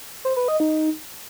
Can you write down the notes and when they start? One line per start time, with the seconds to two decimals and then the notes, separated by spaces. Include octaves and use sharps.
0.25 C5
0.37 B4
0.48 D#5
0.60 D#4